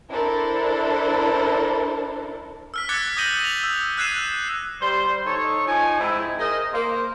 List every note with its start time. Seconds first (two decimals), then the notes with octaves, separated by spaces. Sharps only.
0.11 D4 E4 A4 A#4 C5
2.74 E6 F6 B6
2.89 D6 F#6 G#6 A6 B6 C#7
3.17 D#6 G6 A#6 D#7 F#7 G7
3.40 D#7 F7
3.63 E6
3.98 E6 F#6 G#6 C7 D#7 E7
4.81 G3 C5
5.26 D#4 A4 C#5
5.67 F3 D#4 G#5
5.99 G#2 G#3 C4 E4
6.39 G#4 A#4 C5 D#5
6.73 A#3 C5